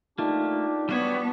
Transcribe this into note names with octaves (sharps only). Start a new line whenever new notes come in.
A3 A#3 D4 D#4 F4 G4
G3 B3 F#4 C#5